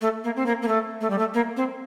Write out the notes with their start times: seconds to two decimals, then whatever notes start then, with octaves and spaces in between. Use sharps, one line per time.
0.01 A3
0.24 A#3
0.36 C4
0.46 A#3
0.62 A#3
0.67 A3
1.01 A3
1.10 G3
1.18 A3
1.34 A#3
1.56 C4